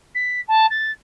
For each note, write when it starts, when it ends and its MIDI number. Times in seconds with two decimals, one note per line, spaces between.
0.14 0.40 95
0.48 0.66 81
0.70 0.91 93